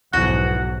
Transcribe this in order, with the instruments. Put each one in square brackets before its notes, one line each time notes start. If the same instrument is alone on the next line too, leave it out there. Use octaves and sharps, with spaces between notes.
[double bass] B1 G#2 [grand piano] E2 E3 F3 [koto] F#4 [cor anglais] F#5